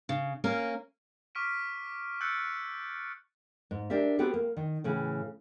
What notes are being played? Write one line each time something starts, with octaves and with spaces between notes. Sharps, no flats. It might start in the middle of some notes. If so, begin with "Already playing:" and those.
C#3
A#3 C#4 A#4
C#6 D6 F6 B6 D7 D#7
E6 F#6 G6 A6 C#7 D7
G#2
D4 G4 A#4 E5
B3 C4 F#4 G4 A4 B4
A#3
D#3
A2 C#3 E3